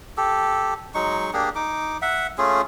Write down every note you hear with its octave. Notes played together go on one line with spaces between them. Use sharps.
G4 A4
F#3 G#3 D#4 C#6
A#3 D4 G4 G#4
D#4 D6
E5 F#5
A3 C#4 F4 G#4